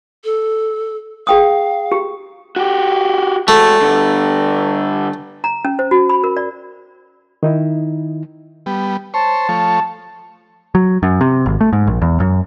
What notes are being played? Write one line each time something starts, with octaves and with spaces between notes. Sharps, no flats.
A4
G#4 F5 G5 D#6
G4
F#4 G4
G#3 A3 F#4
G2 D3
A#5
C#4
C5
F#4
B5
A#4
D5
D#3 D#4 E4
G3 B3
C5 C#5 A5
F3 A3 C#5
F#3
F#2
C3
G#1
A3
G#2
A#1
E2
F#2